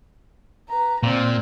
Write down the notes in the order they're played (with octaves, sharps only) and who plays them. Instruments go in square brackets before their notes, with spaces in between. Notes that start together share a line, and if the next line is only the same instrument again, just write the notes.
[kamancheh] B4 A#5
[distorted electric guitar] A#2 [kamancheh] C4 D5